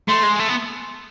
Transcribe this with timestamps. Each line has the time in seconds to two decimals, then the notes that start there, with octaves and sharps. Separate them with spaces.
0.08 A3 C6
0.23 G#3
0.39 A3
0.48 B3